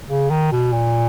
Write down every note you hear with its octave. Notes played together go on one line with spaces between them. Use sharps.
C#3
D#3
B2
A#2